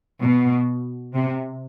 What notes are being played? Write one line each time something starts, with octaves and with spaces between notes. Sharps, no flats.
B2
C3